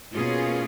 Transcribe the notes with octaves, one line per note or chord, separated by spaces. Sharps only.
B2 A#3 C#4 F4 G#4